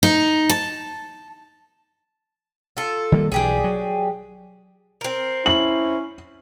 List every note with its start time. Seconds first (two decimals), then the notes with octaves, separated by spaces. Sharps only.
0.03 D#4
0.49 A5
2.77 F4 A4
3.12 D#3 G3 A#3
3.32 B1 E3 D4 G4 G#4
3.64 F#3
5.01 C4 A#4
5.46 C#4 E4 F#7